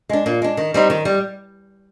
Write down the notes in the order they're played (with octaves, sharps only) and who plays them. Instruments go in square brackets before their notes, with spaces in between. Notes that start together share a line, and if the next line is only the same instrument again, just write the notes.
[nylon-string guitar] G#3 D4
A#2
G#3 D4
D#3
G3 C4 D#4
D#3
G3